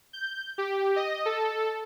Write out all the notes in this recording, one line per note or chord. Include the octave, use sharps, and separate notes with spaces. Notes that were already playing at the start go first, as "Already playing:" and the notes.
G6
G4
D#5
A4